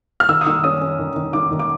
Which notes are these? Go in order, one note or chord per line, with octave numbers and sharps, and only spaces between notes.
F6
D#3 E6
D#6
D#3 E6
C#4 D#6
C#4
D#3
D#3
D#3 D6
D#3
D6